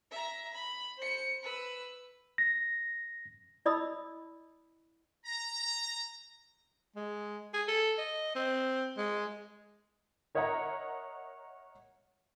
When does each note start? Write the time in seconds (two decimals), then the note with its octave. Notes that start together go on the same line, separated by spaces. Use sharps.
0.11 E5 A#5
0.54 B5
0.97 C5 C#7
1.43 B4 E6
2.38 A#6
3.66 E4 D5 D#5 B5 D#6 E6
5.25 A#5
6.96 G#3
7.54 G#4
7.68 A4
7.98 D#5
8.35 C4
8.97 G#3
10.35 A#4 C#5 D#5 E5 F#5 A#5